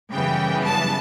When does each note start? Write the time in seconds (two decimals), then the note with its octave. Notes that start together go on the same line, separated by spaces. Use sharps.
0.11 F#2 C#3 E3 G3 B3 G5
0.64 A5